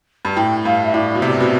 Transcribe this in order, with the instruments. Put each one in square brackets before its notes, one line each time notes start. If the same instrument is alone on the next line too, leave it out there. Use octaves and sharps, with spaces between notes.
[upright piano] G2
[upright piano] A2 [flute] G5
[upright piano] G2 [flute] F5
[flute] E5
[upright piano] A2 [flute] D5
[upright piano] B2
[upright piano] C3 [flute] D5
[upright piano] B2